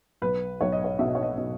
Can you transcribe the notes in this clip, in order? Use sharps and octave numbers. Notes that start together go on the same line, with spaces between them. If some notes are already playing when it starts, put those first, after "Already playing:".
B1 B4
B1 C#5
D#5
C#5
B2 E5
D#5
C#5
D#5
B2 D#5